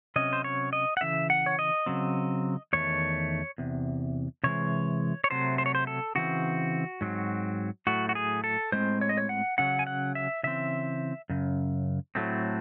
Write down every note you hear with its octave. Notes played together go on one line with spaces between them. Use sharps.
C3 F#3 C#4 D#5
C5
C#5
D#5
F#5
C#3 E3 E5
F#5
C#5
D#5
C#3 F#3 C4
E2 D#3 A3 C#5
E2 C3
C3 E3 G#3 C#5
C#5
C3 F#3 A3 C5
C5
C#5
C5
A4
C#3 E3 C4 F#4
G#2 F#3 C4
A2 F#3 A3 F#4
F#4
G#4
A4
A2 G#3 C4 C5
C#5
D#5
C#5
F#5
C#3 F#3 C#4 F#5
G#5
F#5
E5
C#3 E3 C4 E5
F#2 C#3
A2 F#3 A3 C4